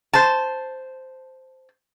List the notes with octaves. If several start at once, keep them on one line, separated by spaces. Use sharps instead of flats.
C5 A5